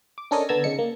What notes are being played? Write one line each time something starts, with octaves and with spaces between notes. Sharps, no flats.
D6
C#4 D4 A4 A#4 C#5 D#5
D3 B3 A5 A#5 E6 G#6
C#3 D#4 C#7
A#3